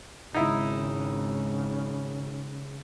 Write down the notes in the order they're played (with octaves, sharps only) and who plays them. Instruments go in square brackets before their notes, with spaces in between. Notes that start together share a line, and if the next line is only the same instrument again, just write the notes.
[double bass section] G#1 [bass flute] C#3 [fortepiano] D#4 E4